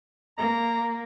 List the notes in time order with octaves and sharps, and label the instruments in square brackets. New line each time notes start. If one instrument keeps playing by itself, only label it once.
[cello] A#3 [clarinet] A#5